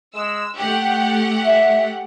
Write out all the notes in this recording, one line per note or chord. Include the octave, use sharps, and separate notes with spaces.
G#3 E6
A3 G4 F#5 G5
E5